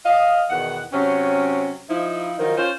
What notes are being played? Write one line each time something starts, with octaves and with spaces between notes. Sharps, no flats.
D#5 F5
E2 B2 D#3 F#5
C3 F#3 C4 C#4
F3 D#4 E4
D#3 F3 F#3 D#4 A#4 C5
C#4 F4 C5